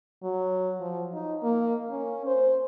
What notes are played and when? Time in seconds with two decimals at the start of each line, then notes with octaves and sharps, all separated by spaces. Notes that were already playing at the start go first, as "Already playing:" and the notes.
0.23 F#3
0.80 F3
1.14 D#4
1.43 A#3
1.90 C#4
2.26 C5